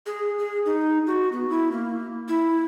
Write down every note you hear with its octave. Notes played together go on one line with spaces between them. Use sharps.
G#4
G#4
D#4
F#4
B3
E4
A#3
E4